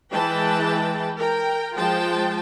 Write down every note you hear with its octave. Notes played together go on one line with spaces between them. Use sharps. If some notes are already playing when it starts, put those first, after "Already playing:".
E3 G#3 B4 G5 A5
A#4 G5
F3 G#3 F4 G5 A5